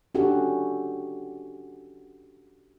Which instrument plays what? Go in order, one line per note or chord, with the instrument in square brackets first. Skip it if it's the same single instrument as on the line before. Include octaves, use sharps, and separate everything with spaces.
[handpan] C#4 D4 F#4 G4 A4